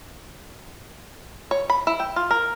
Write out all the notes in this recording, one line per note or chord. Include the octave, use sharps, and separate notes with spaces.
C#5
B5
E4
G5
F4
A#4